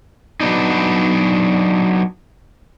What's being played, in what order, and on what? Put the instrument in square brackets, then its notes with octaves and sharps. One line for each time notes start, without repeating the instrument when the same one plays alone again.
[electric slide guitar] F#3 B3 D4 D#4